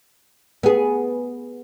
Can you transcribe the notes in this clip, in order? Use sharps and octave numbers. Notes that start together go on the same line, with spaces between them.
B3 G#4